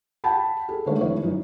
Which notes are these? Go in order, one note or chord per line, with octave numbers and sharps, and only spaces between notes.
F#5 G5 A5 B5
G#4 A4
D3 D#3 G#3 A3 C#5
F1 E4 C#5
F#2 D#4